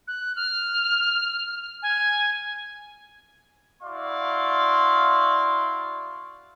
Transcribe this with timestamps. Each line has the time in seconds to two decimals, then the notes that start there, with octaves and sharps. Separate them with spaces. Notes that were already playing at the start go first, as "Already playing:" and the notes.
0.08 F#6
0.36 F6
1.82 G#5
3.83 E4 F#4 D5 F5 C6